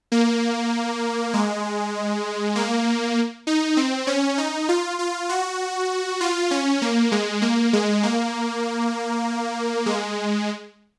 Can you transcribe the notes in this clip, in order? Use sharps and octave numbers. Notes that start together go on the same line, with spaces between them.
A#3
G#3
A#3
D#4
C4
C#4
D#4
F4
F4
F#4
F4
C#4
A#3
G#3
A#3
G#3
A#3
G#3